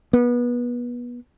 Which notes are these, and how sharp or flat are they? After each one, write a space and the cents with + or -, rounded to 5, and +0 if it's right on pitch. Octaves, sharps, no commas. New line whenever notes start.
B3 -25